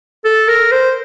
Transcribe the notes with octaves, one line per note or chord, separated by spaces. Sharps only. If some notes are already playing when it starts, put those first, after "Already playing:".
A4
A#4
C5